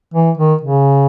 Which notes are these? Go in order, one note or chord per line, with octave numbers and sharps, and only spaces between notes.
E3
D#3
C#3